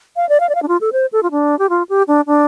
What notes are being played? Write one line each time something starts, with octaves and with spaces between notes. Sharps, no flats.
F5
D5
F5
D5
F5
D4
F4
A4
C5
A4
F4
D4
G4
F4
G4
D4
D4